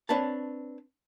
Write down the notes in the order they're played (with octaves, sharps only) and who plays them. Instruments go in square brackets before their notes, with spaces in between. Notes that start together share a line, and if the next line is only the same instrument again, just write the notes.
[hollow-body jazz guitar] C4 D4 B4 C#5 A5